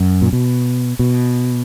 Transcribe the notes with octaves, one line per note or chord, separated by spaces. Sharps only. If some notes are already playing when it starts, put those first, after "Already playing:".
Already playing: F#2
A#2
B2
B2